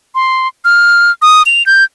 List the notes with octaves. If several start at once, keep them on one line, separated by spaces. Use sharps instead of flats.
C6
F6
D#6
F7
G6